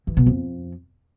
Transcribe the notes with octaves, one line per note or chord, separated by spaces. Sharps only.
E3
B2
F2